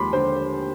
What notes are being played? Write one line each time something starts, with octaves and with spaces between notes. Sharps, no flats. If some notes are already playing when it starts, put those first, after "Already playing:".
Already playing: D#2 F3 G#3 B5 C6 D6
D3 C5